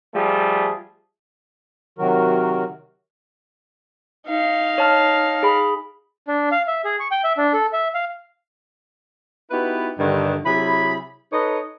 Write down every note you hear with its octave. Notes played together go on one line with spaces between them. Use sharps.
F3 G3 A3 G#4
C3 D#3 F#3 F#4 A#4
D#4 F5
C#5 A5 F6
G#4 B5
D4
F5
E5
G#4
C#6
G5
E5
D4
A4
E5
F5
B3 D#4 E4 F#4 G4 B4
G2 D3 D#3
C3 F#3 E4 G#4 B5
D#4 A4 B4 C#5 D#5